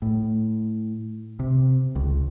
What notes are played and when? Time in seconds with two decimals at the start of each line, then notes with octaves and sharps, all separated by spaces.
0.02 A2
1.39 C3
1.95 C#2